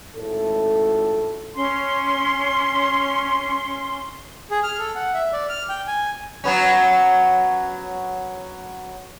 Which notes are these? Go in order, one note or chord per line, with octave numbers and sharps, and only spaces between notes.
G#1 A2 A4
C#4 C6
G#4
F6
A4
F#5
E5
D5
F6
G5
G#5
F#3 B3 C#4